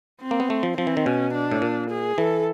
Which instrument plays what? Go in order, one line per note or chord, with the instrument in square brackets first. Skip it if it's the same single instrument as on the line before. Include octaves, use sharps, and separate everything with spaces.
[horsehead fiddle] C4
[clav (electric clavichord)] A#3
B3
A3
F3
[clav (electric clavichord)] F3 [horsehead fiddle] C4
[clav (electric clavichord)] E3
D#3
[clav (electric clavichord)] B2 [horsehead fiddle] C#4
[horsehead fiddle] D4
[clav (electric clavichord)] A2
A#2
[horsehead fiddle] G#4
[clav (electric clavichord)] E3 [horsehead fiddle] A4